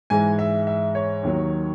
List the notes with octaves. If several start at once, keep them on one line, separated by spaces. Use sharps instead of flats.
G#2 E3 G#3 G#5
E5
E5
C#5
D#2 D#3 F#3